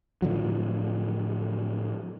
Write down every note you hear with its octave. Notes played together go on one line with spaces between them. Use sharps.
A2 D3 F3 F#3